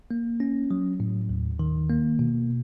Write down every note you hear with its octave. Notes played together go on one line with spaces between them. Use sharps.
A#3
C#4
F#3
A2
D#2
D#3
A#3
B2